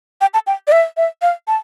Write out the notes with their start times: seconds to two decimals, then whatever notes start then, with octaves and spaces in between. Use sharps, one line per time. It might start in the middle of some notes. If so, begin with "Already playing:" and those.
0.21 G5
0.34 A5
0.47 G5
0.67 D5
0.72 E5
0.97 E5
1.22 F5
1.48 A5